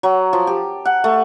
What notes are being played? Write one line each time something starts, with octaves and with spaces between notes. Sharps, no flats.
F#3
F3
G4
F#5
A3